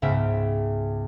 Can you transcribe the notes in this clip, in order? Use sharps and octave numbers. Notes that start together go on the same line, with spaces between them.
C#2 G#2 C#3 B3 E5 G5